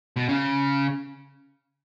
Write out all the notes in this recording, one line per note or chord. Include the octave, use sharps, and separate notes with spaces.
B2
C#3